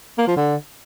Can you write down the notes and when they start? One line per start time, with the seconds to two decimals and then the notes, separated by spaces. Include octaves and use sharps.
0.18 A#3
0.27 F3
0.37 D3